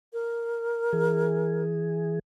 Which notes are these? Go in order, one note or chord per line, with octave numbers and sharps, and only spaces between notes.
A#4
E3 G#4